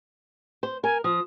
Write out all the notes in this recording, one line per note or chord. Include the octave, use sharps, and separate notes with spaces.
C5
A#4 G#5
F3 D#6